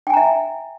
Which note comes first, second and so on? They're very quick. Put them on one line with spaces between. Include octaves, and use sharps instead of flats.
G5 G#5 A#5 E5